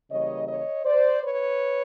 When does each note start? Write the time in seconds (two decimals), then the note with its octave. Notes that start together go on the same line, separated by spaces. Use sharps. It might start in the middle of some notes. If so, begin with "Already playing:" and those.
0.11 C#3 E3 G3 A#3 C#5 D#5
0.47 C#5 D#5
0.84 C5 D5
1.21 B4 C#5